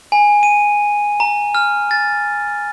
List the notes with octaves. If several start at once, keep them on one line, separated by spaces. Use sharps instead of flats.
G#5
D#7
A#5
F6
A6